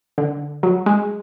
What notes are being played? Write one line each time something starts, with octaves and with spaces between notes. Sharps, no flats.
D3
F#3
G#3